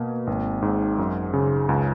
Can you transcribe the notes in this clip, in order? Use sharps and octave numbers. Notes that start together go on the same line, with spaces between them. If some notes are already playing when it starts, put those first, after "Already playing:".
Already playing: B2 A#3
G#1
G#2
F#2
C#3
C#2